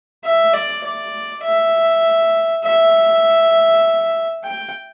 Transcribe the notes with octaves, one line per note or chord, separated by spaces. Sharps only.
E5
D5
D5
E5
E5
G5